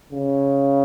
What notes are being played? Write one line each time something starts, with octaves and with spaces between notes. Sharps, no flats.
C#3